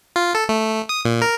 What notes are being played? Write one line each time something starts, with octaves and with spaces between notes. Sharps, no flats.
F4
A4
A3
D#6
A#2
A#4